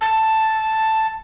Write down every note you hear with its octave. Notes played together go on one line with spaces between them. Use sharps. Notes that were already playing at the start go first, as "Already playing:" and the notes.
A5